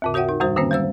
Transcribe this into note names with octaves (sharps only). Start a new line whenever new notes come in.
D#2 G#2 C#3
F#4 A#4 C#5 E5 F#5 G5
D#4 A#4
F2 A2 D#3 G3 F#4 C5
D3 D#3 A#3 C4 C#4
G3 G#3 C5 E6